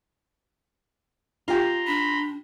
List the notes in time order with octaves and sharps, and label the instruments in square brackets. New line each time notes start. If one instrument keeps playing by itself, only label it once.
[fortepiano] F4 G4 [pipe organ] A#5 C6
[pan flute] D4 [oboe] B5